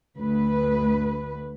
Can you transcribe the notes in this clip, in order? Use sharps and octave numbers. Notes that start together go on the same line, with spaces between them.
D2 B4